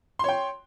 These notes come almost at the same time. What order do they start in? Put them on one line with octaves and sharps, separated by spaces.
C6 C#5 G5